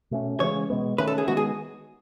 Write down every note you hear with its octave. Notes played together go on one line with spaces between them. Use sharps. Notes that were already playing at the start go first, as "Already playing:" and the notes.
B2 A3 C#4
C#3 E3 G#3 C#4 C#5
B2 G#3 B3
D#3 A3 C#4 B4
A4
G#4
D#3 G#3 B3 F#4
G#4